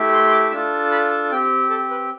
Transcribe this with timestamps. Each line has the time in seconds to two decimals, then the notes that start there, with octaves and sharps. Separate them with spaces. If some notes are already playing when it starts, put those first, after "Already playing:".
Already playing: A3 E4 G4
0.13 C6
0.27 C6
0.32 D6
0.51 D4 F4 A4 E6
0.92 B5
1.11 A5
1.31 C4 G4 G5
1.70 A4
1.90 B4